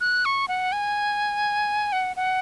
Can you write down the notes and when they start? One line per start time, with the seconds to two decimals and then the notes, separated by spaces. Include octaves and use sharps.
0.01 F#6
0.25 C#6
0.48 F#5
0.72 G#5
1.92 F#5
2.16 F#5